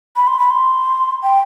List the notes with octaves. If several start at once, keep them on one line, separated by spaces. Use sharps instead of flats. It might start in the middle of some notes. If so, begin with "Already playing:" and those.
B5
C6
B5
C6
G5